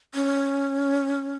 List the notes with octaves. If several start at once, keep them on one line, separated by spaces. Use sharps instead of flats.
C#4